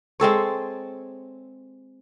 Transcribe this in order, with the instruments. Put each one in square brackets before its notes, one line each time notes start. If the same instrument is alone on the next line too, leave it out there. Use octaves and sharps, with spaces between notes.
[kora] G#3 C4 A4 C#5